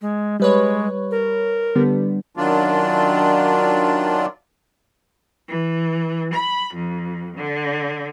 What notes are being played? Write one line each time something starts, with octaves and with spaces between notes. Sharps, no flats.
G#3
G3 G#3 B4 C#5
A#4
D3 G3 B3
F#2 D#3 F#3 D4 F4 D5
E3
B5
F2
D3